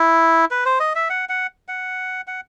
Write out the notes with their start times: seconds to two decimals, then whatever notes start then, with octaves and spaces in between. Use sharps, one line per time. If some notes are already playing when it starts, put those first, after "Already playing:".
Already playing: E4
0.51 B4
0.65 C5
0.80 D#5
0.95 E5
1.10 F#5
1.29 F#5
1.68 F#5
2.27 F#5